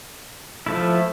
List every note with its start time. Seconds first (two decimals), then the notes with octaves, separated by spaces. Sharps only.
0.66 F3 A3 E4